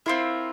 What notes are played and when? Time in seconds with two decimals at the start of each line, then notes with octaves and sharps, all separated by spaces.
0.06 C4 E4 F4 A#4